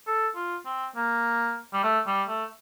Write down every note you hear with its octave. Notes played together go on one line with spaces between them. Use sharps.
A4
F4
C4
A#3
G3
A3
G3
A3